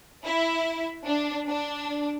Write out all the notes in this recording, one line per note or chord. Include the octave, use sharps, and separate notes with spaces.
E4
D4
D4